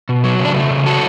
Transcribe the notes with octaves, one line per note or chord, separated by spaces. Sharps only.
B2
F#3
C#3
D4
A3
C#3
F#3 F#4 A4